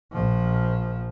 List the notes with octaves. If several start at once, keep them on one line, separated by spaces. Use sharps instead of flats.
A#1 F3